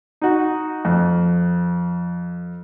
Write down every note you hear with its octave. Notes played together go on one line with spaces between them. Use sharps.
D#4 F#4
F2